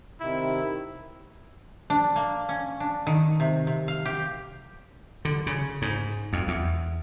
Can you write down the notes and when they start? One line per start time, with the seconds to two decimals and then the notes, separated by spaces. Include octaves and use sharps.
0.20 C3 D#3 E4
1.90 D4
2.16 A#3
2.49 C#4
2.80 D4
3.07 D#3
3.40 C3
3.67 C3
3.88 F5
4.05 G4
5.25 D3
5.47 C#3
5.82 G#2
6.33 F2
6.48 E2